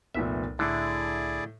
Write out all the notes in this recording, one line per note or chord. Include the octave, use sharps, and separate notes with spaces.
F1 C2 A#2 B3 E5
A2 D3 E4 G#4 D5